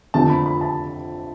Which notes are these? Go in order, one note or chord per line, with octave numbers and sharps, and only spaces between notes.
F2 D3 A3 C4 A5
B5
B5
A5